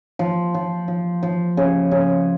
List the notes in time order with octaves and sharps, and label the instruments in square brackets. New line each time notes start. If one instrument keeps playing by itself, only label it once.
[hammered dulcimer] F3
F3
F3
F3
C#3
C#3